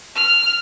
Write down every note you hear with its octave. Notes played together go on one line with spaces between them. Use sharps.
F6